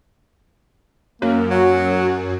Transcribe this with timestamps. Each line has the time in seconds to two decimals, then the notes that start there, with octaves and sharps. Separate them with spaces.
1.22 F#2 A#3
1.51 F#3 F#4